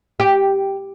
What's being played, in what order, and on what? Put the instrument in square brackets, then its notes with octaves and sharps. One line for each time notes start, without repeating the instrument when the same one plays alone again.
[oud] G4